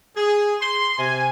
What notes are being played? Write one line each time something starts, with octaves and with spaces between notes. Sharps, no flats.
G#4
C6
C3 G#5